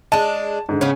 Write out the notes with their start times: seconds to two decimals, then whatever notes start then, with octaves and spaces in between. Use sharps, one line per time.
0.12 G#3 D4 A5
0.69 G#2 D3
0.81 C#3 F3 B3 C#4